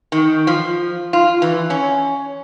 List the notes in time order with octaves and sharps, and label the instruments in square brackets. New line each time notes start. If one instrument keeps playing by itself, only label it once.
[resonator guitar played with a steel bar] D#3
F3
F4
E3
C#4